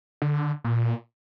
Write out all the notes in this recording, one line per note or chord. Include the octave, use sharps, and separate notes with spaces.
D3
A#2